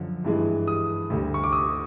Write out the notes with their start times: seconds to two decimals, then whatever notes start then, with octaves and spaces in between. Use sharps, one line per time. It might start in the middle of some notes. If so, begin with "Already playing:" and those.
Already playing: F#2 D3 F3
0.25 G2 E3 G#3
0.68 D#6
1.10 D2 D3 G3
1.34 C#6
1.44 D6
1.53 D#6